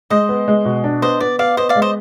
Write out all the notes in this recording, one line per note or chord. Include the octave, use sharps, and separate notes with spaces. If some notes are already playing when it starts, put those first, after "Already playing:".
G#3 C5 D#5
B3
G#3
B2
D4
B3 C5 D#5
B3 D5
B3 D5 F5
B3 C5 D#5
D5 F5
G#3
C5 D#5